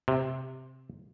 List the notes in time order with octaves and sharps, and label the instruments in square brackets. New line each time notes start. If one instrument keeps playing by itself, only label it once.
[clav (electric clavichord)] C3